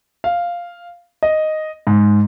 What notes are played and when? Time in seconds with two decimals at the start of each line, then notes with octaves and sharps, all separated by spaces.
0.24 F5
1.23 D#5
1.87 G#2